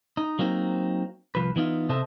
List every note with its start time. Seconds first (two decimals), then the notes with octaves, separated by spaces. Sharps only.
0.17 D#4
0.39 F#3 A#3 C4 D#4
1.35 C2 F3 B4
1.56 E3 B3 D#4 F4
1.89 C3 A4 C5 D#5 E5 A5